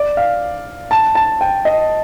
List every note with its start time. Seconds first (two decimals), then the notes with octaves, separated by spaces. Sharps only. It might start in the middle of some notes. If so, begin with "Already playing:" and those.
Already playing: D5
0.17 F5
0.91 A5
1.15 A5
1.41 G5
1.65 D#5